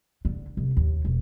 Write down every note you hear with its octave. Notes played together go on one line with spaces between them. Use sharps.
D3
C2
D#2
E1